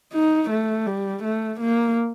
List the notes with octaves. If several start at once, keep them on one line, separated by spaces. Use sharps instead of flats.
D#4
A3
G3
A3
A#3